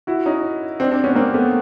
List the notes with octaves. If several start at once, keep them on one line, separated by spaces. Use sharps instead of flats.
E4 F#4
C#4 D#4
C4 D4
C4 D4
B3 C#4
A#3 C4
A3 B3